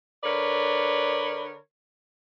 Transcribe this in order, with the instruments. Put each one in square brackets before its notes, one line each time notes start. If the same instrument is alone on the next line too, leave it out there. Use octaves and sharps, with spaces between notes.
[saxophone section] D3 A#4 B4 C#5 D5